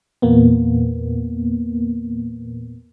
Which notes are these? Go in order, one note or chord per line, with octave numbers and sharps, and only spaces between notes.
E2 A#2 A#3 B3